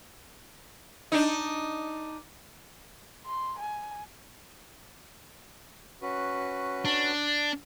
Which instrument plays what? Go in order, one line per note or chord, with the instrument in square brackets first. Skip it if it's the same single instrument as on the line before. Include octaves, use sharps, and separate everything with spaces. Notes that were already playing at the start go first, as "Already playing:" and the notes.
[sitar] D4 D#4
[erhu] C6
G#5
[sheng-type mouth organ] C#4 F#4 B4
[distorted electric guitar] D4